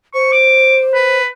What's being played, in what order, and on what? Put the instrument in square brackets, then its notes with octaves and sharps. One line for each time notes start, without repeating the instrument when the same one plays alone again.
[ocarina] C5 [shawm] C#6
[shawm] D6
B4